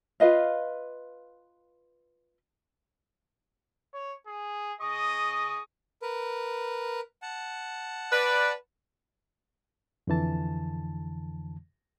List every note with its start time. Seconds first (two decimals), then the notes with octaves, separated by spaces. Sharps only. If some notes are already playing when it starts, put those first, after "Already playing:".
0.20 F4 B4 D#5 F5
3.94 C#5
4.27 G#4
4.81 G#4 D#5 C#6 D#6
6.02 A#4 B4
7.22 F#5 A5
8.12 B4 D5
10.07 F2 D3 E3 A5